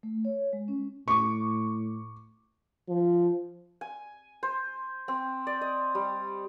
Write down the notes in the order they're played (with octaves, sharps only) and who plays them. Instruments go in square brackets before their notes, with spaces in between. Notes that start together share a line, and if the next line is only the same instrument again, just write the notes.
[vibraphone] A3
C#5
G#3
C#4
[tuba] A2 [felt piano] C#6 D6
[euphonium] F3
[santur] G#5
C5
C4
D5
D#5
G3